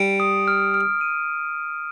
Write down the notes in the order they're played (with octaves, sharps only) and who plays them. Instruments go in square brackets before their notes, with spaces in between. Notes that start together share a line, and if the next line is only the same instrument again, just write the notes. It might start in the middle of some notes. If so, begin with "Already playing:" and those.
Already playing: [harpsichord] G3 [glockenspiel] D7
[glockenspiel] D#6
F6
F6
D#7